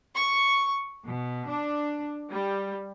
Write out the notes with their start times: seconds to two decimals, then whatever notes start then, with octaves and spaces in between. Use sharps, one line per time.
0.16 C#6
1.06 B2
1.49 D4
2.31 G3